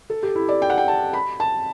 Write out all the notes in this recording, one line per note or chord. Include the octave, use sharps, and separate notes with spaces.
A4
G4
E4
D5
G5
F#5
G5
A5
B5
A5